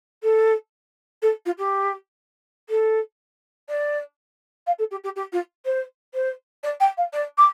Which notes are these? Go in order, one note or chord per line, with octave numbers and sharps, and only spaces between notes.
A4
A4
F4
G4
A4
D5
F5
A4
G4
G4
G4
F4
C5
C5
D5
G5
F5
D5
D6